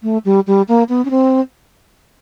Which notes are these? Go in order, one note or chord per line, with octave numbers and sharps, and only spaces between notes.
A3
G3
G3
A#3
B3
C#4
C4